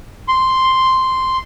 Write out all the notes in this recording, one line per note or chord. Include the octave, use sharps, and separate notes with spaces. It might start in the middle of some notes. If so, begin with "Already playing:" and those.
C6